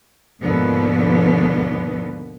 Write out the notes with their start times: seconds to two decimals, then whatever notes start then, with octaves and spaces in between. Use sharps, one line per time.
0.41 D#2 G#2 B2 D3 F3 B3